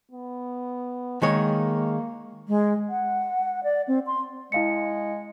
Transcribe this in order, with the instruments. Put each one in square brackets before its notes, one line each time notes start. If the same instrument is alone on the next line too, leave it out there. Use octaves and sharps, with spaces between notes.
[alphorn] B3
[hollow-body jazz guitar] D#3 G#3 C#5 [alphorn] A#3
[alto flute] G#3
F#5
D5
C4
C6
[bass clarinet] G#3 [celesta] E4 F5 C#7